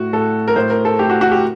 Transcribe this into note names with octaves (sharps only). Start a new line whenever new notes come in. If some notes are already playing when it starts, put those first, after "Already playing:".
Already playing: A2 F#4
A2 A4
A#4
A2 C5
A#4
A4
A2 G4
F#4
F#4
G4